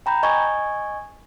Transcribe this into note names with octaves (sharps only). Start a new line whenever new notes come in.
G5 A#5 B5 G6
D#5 G#5 C#6 G#6